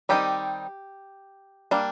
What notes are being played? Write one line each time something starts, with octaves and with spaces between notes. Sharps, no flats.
D#3 G3 C4 D#4 G4
G3 A#3 D4